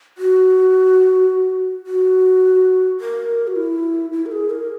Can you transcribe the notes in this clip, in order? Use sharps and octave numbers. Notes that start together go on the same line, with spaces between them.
F#4
F#4
A#4
F#4
E4
E4
A#4
G#4
A#4